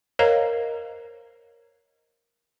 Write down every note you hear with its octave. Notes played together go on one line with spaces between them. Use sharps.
A#4 C5 C#5 D#5 F5 A#5